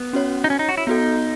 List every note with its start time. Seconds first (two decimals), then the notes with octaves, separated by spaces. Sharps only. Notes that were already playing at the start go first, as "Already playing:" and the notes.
Already playing: B3
0.13 C#4 F#4 C#5
0.44 D#4
0.50 C#4
0.59 D#4
0.69 F#4
0.77 E4
0.87 B3 D#4 F#4 A4